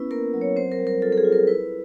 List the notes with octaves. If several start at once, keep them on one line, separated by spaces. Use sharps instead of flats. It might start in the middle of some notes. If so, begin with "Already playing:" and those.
Already playing: B3 C#4 E4 B4
A#3 A#4
F#3
C#5
C4 C5
A#4
G3
A#4
F4 A4
A4
G#4
F4
A#4
E4 B4